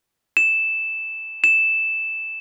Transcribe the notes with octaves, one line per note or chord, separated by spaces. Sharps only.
E7
E7